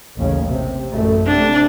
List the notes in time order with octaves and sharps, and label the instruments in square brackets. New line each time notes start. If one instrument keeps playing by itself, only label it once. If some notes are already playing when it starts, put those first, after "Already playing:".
[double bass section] A1 D#2 C#3
C3
A1 F#2 A3
[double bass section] C3 A3 [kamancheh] D4